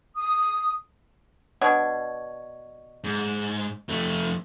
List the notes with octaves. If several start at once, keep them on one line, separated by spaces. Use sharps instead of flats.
D#6
B2 D4 C#5
G#2
F2 A3